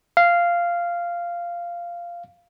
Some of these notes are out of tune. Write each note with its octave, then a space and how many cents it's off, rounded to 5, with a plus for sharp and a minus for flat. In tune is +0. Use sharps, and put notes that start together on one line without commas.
F5 -10